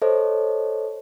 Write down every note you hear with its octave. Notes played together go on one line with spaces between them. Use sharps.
A4 C5 C#5 D#5